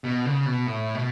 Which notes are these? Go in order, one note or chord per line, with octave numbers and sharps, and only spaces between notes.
B2
C#3
B2
A2
B2